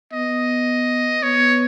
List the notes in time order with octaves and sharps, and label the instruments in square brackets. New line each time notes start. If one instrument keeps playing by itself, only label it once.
[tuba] B3 [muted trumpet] D#5
[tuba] B3 [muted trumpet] C#5